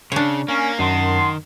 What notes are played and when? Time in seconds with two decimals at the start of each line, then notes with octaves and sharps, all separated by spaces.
0.12 C#3 D4 C#5
0.48 A#3 C#4
0.79 F#2 D#3 F#5 A5 C6